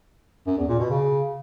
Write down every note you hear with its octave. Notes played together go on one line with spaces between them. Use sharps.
F#2
E2
A#2
B2
C#3